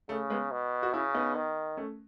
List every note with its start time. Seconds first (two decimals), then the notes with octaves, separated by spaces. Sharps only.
0.09 C#3 A3
0.30 G#3 B3
0.51 B2
0.83 F#4
0.93 C#3 C#4 E4
1.14 B3 D#4
1.35 D#3
1.77 A3 C#4